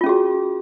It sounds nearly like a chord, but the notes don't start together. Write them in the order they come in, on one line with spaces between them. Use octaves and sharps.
F4 C#4 G#4 F#4